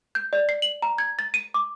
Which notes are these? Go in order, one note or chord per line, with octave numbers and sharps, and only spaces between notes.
G6
D5
C7
F#7
A#5
G#6
A6
D#7
D6